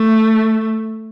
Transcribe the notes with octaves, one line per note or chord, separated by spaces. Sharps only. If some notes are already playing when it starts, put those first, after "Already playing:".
Already playing: A3